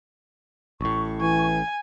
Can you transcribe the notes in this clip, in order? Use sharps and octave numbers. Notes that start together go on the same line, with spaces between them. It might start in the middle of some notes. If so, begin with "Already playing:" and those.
A1 A2 C#6
E3 G#5